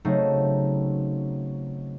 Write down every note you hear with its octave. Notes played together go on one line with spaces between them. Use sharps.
C#3 F#3 A3 C4 D#4